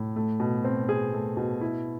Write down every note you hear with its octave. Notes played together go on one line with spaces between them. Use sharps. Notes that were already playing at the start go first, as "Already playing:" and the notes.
Already playing: A2
A3
B2
C4
G#4
A3
B2
E4